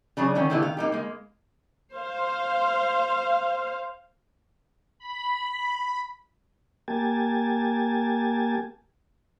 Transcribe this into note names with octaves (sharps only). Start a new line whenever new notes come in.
C#3 F#3 D4 G#4
D3 D#3 A3 C#4
B2 D3 A3 B3 E4 G4
D#3 F5
A#3 D#4 G4
G#3 A#3
C5 F5
B5
A#3 G4 G#5 A5